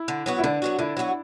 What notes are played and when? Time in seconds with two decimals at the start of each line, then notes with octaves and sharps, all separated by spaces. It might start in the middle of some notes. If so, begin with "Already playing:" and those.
Already playing: E4
0.08 D3
0.26 F#3 B3 F#4
0.38 E4
0.44 D3 D4
0.62 F#3 B3 F#4
0.79 D3 E4
0.97 F#3 B3 F#4